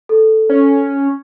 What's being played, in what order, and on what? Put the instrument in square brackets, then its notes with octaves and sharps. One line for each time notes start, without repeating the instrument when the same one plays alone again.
[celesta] A4
[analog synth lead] C#4